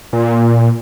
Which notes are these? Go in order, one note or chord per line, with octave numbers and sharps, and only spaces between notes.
A#2